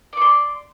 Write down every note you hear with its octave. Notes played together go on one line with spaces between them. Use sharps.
D5 C6 C#6